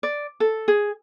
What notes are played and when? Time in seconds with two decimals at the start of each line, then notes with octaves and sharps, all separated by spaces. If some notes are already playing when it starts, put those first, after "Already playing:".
0.03 D5
0.40 A4
0.68 G#4